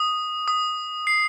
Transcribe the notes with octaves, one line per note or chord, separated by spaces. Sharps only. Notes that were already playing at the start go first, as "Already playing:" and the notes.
Already playing: D#6
D#6
C7